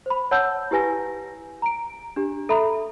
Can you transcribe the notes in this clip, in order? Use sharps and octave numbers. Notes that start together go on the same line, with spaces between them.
C5 B5
C#5 F#5 A5 E6 G6
E4 G4 B4 G#5 A#6
A#5 D7
D4 G4
A4 E5 A#5 B5